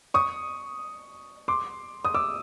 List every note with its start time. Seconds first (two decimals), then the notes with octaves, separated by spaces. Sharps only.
0.14 C#6 D#6
1.48 C6 D6
2.05 D#6
2.14 D6 E6